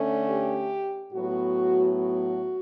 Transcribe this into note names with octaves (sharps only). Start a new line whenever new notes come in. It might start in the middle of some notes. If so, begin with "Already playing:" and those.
Already playing: D3 A3 C#4
G4
A2 F#3 B3 F#4
F#4